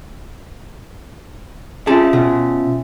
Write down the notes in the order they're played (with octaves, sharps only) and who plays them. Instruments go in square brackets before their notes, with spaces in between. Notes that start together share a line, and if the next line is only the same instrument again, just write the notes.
[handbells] C#4 F4 E5 [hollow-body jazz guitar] G#4 A5
[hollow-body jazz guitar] B2